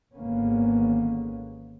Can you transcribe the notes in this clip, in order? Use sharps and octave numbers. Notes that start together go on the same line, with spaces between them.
G#1 G#2 D3 A#3 B3 C#4